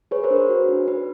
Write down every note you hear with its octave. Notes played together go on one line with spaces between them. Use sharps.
G#4 B4 C#5
A#4 C5
D4
B4
F#4
D4
D4 B4